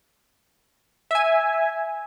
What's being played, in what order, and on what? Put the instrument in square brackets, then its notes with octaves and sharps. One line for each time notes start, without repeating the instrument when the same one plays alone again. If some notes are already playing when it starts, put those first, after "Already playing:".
[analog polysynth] E5 G#5